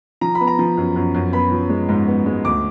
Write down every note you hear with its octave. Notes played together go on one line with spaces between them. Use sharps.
F3 A#5
B5
B3
A#5
F3
F#2
F#2
F#2
B3 B5
F3
G#3
G#2
B3
G#3
D2 D6